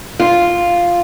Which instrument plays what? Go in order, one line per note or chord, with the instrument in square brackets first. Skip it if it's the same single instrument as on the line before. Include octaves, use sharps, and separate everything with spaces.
[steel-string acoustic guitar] F4